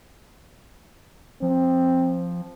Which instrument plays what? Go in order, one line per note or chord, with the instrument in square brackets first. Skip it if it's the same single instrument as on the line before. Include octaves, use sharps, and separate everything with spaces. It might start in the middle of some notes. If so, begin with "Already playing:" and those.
[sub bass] F3 [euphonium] C4